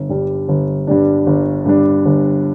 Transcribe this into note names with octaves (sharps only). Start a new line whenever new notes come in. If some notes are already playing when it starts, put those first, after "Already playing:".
Already playing: G1
G2 G3 D4
G1
G2 G3 D4
G1
G2 G3 D4
G1